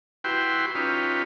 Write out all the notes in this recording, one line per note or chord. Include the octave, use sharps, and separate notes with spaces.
E4 F#4 G4 B4 G5 C6
C#4 D#4 F4 G4 B4